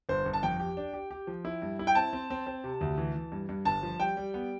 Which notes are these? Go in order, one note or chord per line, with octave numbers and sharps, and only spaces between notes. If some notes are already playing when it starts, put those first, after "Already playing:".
G1 C5
G1
A5
F2 G5
G4
D4
G4
G4
F3
E4
G2
E4
G5
C4 A5
C4
C4
C4
C3
D2
E3
E3
G2
G2
G1 A5
F3
G3 G5
G3
B3